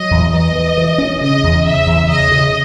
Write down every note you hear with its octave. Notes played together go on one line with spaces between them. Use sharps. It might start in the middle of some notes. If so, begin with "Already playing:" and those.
Already playing: F#3 D#5
E2
E3 D#5
E3
E3
C#4
C#3 D#5
E2
C#3 E5
E2
C#3 D#5
C#3